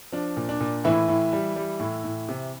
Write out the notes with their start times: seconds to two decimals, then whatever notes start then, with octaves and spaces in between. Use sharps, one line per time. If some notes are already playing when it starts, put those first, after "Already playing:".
0.12 F3 D4
0.37 A#2
0.49 D4
0.60 A#2
0.84 A2 E3 E4
1.08 A2
1.33 G3
1.56 G3
1.80 A2
2.04 A2
2.29 C3